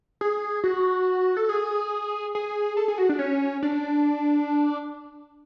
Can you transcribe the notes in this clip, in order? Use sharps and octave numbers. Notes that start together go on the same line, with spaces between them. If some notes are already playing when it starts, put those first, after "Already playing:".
G#4
F#4
A4
G#4
G#4
A4
G#4
F#4
D4
C#4
D4